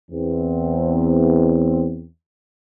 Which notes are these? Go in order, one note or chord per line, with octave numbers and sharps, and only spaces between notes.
E2 C4